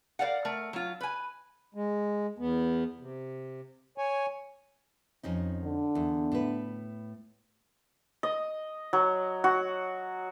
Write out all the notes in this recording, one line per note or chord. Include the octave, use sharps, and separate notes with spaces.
A#4 C5 D5 F5 F#5
A3 A#4
F#3 F4
B4 G#5
G#3
E2 B3
C3
C#5 G#5
F2 C#4 D#4
D3
E2
A2 B4
D#5
F#3
F#4